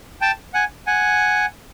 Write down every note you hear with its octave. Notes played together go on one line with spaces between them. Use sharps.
G5 A5
F#5 G#5
F#5 G#5